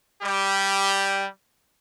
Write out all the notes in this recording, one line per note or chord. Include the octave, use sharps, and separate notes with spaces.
G3 G4